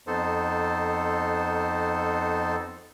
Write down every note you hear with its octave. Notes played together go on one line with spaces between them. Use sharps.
F2 B3 D#4 A4 C5